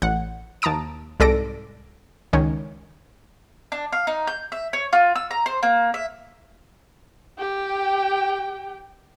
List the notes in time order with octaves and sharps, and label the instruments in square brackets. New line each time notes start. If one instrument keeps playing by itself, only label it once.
[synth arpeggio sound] A1 F#5
D#2 A5 A#5 D#6 D7
C2 G#2 A4 D5 A#6 D7
C#2 D#3 C#4
[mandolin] D4
F5
D#4
G6
E5
C#5
F4
E6
A#5
C5
A#3
E5
[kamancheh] G4 G5